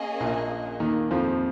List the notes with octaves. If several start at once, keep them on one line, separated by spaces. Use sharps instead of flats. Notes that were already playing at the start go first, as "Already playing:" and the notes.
Already playing: A#3 C#4 G#4 D#5
A#1 A#2
D#2 D#3
F2 F3